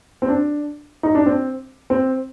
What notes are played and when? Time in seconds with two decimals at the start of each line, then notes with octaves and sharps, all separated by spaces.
0.22 C4
0.28 D4
1.03 D#4
1.15 D4
1.26 C4
1.90 C4